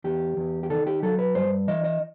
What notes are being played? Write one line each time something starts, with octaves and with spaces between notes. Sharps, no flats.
E2 G4
E2
G4
D#3 A4
G4
F#3 A4
B4
G2 C5
E3 D#5
D#5